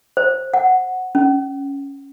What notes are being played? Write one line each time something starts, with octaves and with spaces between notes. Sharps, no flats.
C5
F#5
C#4